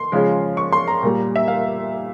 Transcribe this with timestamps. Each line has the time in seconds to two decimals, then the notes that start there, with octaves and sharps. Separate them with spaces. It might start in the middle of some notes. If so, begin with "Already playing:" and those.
Already playing: C6
0.12 C#3 F3 G#3
0.57 C#6
0.73 C6
0.87 A#5
1.03 A#2 G3
1.36 E5
1.48 F5